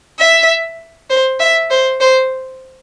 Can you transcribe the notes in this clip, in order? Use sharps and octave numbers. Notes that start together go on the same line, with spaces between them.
E5
C5
E5
C5
C5